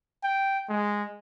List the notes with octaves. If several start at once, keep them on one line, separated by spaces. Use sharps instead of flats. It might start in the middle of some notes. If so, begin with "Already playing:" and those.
G5
G#3